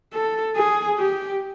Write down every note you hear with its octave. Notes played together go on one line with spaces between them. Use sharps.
A4
G#4
G4